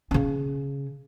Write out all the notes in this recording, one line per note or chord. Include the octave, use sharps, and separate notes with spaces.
C#3 C#4